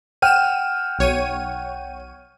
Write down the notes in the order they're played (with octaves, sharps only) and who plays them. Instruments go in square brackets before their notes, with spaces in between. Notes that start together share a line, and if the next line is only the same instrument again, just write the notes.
[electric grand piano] F#5 G5 F6 [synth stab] D#7 E7
[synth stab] B1 C#5 D#7